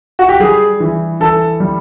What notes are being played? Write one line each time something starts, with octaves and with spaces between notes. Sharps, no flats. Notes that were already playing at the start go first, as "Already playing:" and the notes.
F#4
G4
G3 G#4
E3
E3 A4
G3